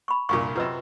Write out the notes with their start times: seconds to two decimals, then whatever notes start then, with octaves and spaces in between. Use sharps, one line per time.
0.08 B5 C#6
0.29 C2 G2 A#2 C#6
0.56 F#2 C3 F4 B4 D#5